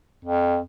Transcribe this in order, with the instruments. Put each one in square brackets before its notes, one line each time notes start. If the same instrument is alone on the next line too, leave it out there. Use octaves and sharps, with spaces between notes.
[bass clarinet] F2